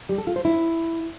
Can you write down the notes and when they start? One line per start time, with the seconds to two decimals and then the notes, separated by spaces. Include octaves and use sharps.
0.09 G3
0.18 A4
0.27 F4
0.36 C5
0.45 E4